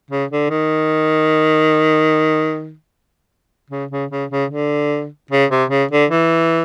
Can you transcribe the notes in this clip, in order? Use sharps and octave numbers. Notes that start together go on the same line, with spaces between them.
C#3
D3
D#3
C#3
C#3
C#3
C#3
D3
C#3
C3
C#3
D3
E3